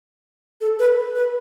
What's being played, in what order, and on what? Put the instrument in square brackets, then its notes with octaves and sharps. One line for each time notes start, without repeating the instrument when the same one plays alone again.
[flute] A4
B4
B4